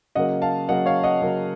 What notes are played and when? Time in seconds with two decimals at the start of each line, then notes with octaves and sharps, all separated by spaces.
0.15 C#3 F#3 A#3 D#5 F#5
0.42 F5 A5
0.68 C#3 F#3 A#3 D#5 F#5
0.86 C#5 F5
1.03 D#5 F#5
1.22 C#3 F#3 A#3